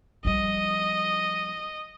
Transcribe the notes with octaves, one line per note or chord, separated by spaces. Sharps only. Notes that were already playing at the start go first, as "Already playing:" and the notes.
F3 G3 D#5